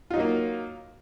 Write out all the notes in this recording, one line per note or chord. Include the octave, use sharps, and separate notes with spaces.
F#3 A#3 D#4 F4